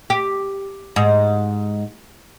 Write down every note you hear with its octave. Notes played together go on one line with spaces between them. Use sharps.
G4
G#2